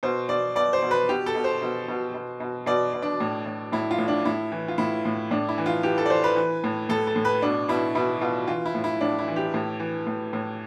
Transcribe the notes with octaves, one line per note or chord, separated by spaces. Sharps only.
B2 C5
B2 D5
B2 D5
C5
B2
B4
B2 G4
A4
B2
C5
B2
B2
B2
B2
B2 D5
B2
D4
A2
A2
A2 E4
F4
A2
D4
A2 E4
E3
F4
A2 E4
A2
A2 D4
E4
E3
F4
E3 G4
A4
D5
E3 C5
B4
E3
A2
A2 A4
A4
A2
B4
B2 D4
B2 E4
B2 E4
B2 F4
E3 F4
E4
A2
E4
A2 D4
E4
E3
G4
A2
E3
A2
A2